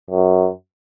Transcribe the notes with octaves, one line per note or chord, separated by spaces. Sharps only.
F#2